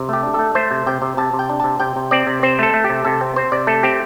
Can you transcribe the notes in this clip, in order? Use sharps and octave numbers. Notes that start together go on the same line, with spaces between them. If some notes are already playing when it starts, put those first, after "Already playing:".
Already playing: C3
A3 G4
D4
A3 A4
A3 C5
C3
C3 G5
C3
C3 A5
C3
G5
D4
C3 A5
C3 G5
C3
C4 D5
C3
C4 C5
A3 A4
A3
G4
C3
C3 A4
C4
C4 C5
C3 D5
A3 A4
C4 G4